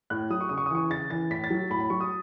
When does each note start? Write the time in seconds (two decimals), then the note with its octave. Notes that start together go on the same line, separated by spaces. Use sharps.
0.10 A2 F#6
0.30 F#3 D#6
0.41 C#6
0.49 C#3 D#6
0.58 C#6
0.66 D#6
0.71 E3 C#6
0.90 C#3 A6
1.10 E3 A6
1.30 A2 B6
1.44 A6
1.50 F#3
1.70 A2 B5
1.80 B5
1.90 F#3 C#6
2.00 D#6